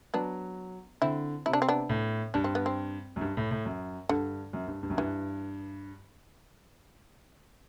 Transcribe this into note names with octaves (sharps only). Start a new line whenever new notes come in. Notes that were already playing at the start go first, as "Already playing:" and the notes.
F#3 B3 D4
D3 C4 E4
C3 E4
D4
C4
B3 D4
A2
G2 D4
C4
B3
C4
F#2
G2
A2
A2
F#2
G2 D3
F#2
G2
G2
F#2
G2 E3